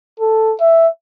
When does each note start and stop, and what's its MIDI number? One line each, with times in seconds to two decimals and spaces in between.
0.20 0.54 69
0.60 0.88 76